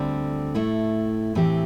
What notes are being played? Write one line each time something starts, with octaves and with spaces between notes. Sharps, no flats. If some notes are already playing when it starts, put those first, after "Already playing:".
Already playing: D2 D3 G3 C4
A2 A3 E4
A2 E3 C4 G4